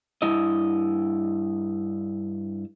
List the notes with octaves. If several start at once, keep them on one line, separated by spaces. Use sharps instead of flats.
G2 E4 D#5